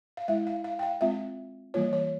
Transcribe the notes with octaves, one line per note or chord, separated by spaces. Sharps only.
F5
G#3 E4 E5
F5
F5
G5
F5
G#3 C4 F4 E5
E3 G3 A#3 F4 C#5
C#5